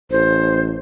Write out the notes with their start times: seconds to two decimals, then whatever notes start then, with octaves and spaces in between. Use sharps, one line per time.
0.11 A1 C5